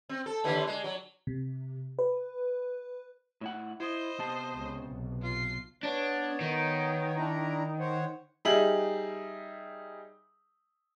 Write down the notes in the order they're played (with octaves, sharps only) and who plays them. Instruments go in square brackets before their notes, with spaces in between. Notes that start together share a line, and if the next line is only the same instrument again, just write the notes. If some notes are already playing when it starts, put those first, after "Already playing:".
[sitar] C4
A4
D#2 D3 E3
G#3
F#3
[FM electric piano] C3
B4
[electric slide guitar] A2 E4 F#5
[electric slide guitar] E4 [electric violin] C5 D#5
[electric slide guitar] C3 B3 A5
[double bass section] C#2 C#3
B1
[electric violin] F4 C7
[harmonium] B3 C#5 [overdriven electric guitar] D4
[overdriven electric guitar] D#3
[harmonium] D4 E4 A#5
C5 C#5 F#5
[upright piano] G3 D#4 G#4 E5 F#7